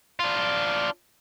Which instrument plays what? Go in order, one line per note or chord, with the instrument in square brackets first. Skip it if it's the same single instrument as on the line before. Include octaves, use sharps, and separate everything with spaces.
[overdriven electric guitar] D4 F4